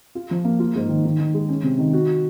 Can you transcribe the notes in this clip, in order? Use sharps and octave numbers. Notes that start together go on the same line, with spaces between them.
F4
F3
A#3
F4
G#2
D#3
D#3
D#3
G#3
C#4
C3
D#3
F#4